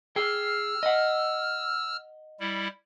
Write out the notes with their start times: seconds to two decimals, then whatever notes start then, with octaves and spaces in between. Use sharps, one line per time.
0.16 G#4 G5 E6 F6
0.83 D#5 F#5
2.40 G3 E4